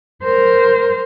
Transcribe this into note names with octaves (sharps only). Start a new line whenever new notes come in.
A#4 C5